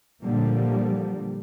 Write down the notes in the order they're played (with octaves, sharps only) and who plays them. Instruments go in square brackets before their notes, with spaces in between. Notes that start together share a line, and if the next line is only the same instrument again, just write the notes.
[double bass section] A#2 D3 F3 G3 A#3